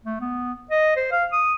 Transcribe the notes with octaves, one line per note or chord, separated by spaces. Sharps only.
A3
B3
D#5
C5
F5
D#6